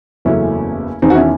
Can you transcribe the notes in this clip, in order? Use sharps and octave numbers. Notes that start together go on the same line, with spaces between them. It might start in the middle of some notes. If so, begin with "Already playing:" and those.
F#1 E2 C#3 F#3 A3 C#4 E4
E1 E2 D#3 C4 D#4
F#4
C#4 E4